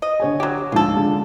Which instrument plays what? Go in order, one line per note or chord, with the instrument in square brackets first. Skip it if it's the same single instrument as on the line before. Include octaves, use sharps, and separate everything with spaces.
[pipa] D#5
[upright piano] D3 C#5 G#5
[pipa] F#3 G4
[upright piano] D2 G#2 F3 [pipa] F4 A4
[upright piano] D3 G#3 D4